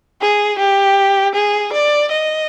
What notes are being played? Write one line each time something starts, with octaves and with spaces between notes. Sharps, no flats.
G#4
G4
G#4
D5
D#5